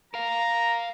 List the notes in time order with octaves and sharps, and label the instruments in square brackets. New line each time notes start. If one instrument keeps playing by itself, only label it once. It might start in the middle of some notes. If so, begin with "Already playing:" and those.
[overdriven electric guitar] A#4 F5 [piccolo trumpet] A#5